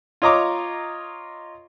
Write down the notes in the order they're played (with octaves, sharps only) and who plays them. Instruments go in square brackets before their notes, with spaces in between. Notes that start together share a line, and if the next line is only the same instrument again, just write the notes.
[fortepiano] F4 C#5 D#5 A#5 D6